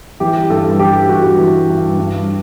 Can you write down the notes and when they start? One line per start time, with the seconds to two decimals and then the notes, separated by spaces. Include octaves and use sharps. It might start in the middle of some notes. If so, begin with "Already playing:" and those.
0.20 E3 G4
0.50 G2 A4
0.79 E3 G4
1.09 G2 F#4
1.39 E3
1.69 G2
1.98 G2